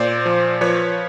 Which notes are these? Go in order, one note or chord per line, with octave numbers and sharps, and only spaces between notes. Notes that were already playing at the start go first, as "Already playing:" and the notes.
Already playing: A#2 C5 D5
F3
F3 B4 C#5